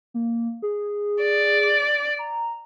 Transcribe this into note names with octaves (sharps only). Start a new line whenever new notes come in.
A#3
G#4
D5
A#5